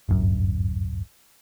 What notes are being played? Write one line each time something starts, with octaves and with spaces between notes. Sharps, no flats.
D1 G1 F#2